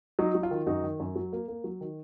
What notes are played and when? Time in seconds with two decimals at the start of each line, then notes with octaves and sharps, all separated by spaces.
0.19 F#3 D#4
0.35 F#3
0.43 F4
0.51 D#3
0.66 F#2 D#4 F#4
0.83 D#3
1.00 F#2
1.16 F#3
1.33 A#3
1.48 A#3
1.64 F#3
1.81 D#3